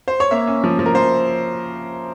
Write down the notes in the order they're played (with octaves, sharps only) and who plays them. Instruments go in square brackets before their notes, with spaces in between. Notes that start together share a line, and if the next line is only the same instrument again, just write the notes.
[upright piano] C5
C#5
A#3 E5
C#4
F3
F3
A#4
F3 C5